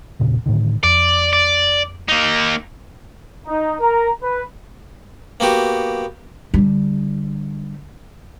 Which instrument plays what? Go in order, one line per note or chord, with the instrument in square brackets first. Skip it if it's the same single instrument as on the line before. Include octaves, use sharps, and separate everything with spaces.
[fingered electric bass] E1 A#2 C#3
A2 D3 D#3
[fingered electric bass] F2 [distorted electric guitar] D5
[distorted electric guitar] D5
A#3 D#4
[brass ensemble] D#4
A#4 A#5
B4
[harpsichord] A#3 B3 F#4 G4
[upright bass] D3 G3